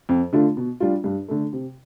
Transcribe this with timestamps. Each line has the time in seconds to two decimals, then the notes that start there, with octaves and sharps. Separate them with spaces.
0.09 F2
0.33 D3 A3 D4 F4
0.57 B2
0.80 G3 D4 F4
1.04 G2
1.28 D3 A3
1.53 C3